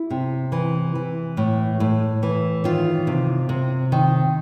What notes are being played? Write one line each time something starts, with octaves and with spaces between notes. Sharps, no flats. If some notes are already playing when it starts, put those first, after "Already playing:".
Already playing: E4
C3
E3
E3
A2
A2
E3
D#3 F4
C3
C3
D#3